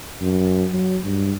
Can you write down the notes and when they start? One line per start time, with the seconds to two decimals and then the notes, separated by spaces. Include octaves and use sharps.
0.22 F#2
0.72 F#3
1.04 G2